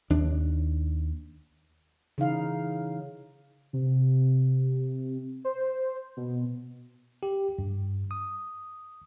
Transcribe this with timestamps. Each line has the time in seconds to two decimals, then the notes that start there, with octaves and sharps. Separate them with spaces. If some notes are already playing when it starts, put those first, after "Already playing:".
0.10 D#2 D4
2.18 C#3 E3 D#4 E4 F5
3.73 C3
5.45 C5
6.17 B2
7.23 G4
7.58 G2
8.11 D#6